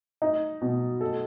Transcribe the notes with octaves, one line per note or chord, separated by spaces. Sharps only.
D#4
B2
A4